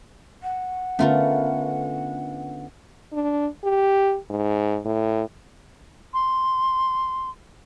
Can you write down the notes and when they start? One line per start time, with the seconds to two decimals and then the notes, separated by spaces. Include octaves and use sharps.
0.42 F#5
0.99 D3 A3 B3 C#4 F4 A#4
3.13 D4
3.64 G4
4.30 G#2
4.85 A2
6.14 C6